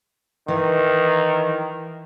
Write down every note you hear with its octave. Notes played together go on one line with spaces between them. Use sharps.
D#3 E3